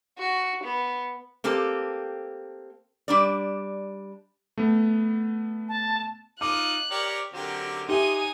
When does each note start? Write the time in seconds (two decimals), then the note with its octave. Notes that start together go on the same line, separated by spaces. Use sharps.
0.19 F#4
0.63 B3
1.44 A#3 C4 G4 A4
3.08 G3 D4 D5
4.58 A3 B3
5.69 A5
6.41 D#4 F4 D6 F#6
6.91 G4 A#4 C#5 D5
7.33 D3 F#3 C4 G4 A#4
7.89 D#4 G4 E5 G#5 C6 D#6